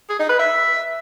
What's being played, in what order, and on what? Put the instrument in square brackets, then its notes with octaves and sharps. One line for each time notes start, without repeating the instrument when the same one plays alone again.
[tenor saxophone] G#4
D#4
B4
E5